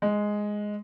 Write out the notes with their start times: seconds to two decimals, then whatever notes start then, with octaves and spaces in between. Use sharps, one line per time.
0.02 G#3